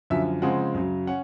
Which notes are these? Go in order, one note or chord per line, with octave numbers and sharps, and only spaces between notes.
F#2 D3 F3 E5
C#3 F3 G#3 C4 F#5
F#2 C#3 F#3
C#4 F#5